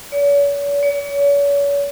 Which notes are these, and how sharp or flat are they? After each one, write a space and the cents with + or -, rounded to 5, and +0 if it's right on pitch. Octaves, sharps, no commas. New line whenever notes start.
C#5 +45
C#5 +40